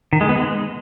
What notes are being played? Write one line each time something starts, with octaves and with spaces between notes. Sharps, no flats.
D#3
G#3
B3
G#3